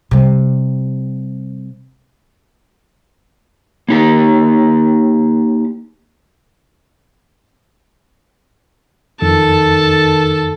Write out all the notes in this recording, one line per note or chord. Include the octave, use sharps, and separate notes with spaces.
C3 G3
A#3 D#4 G4
F2 D#3 A4 A5